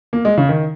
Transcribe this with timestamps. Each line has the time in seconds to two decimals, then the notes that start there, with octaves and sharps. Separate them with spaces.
0.13 A#3
0.25 G#3
0.38 C#3
0.49 D#3